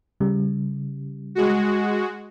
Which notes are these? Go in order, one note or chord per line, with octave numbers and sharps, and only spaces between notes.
C#3 G3
G#3 F#4